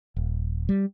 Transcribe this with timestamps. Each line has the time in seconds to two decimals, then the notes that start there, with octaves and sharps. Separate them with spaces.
0.16 D#1
0.69 G3